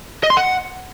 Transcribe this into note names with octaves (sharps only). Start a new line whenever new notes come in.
D#5
C6
F#5